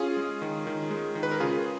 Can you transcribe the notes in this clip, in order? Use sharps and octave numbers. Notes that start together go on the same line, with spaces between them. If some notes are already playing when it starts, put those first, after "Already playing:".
Already playing: C#4 F4 G#4
G#3
D#3
D#3
G#3
D#3
B4
A#4
C#3 F4 G#4